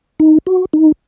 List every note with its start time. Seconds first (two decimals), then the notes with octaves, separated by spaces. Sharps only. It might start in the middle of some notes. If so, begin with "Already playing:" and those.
0.20 D#4
0.47 F#4
0.73 D#4